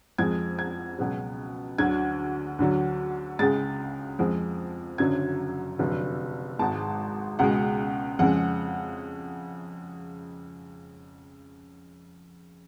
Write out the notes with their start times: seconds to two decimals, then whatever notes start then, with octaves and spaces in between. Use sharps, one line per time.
0.18 F2 F3 G#3 G#6
0.59 G#6
0.99 C#2 B2 F#3
1.78 D2 D3 F#3 G#6
2.59 D2 D3 F#3
3.39 C#2 C#3 G#3 A6
4.19 F2 F3 G#3
4.98 F#1 F#2 D3 F#3 G#6
5.79 F1 F2 D3 F#3
6.59 G#1 G#2 G#3 A5
7.39 C#2 B2 G#3 F#5
8.19 F2 C#3 G#3 F#5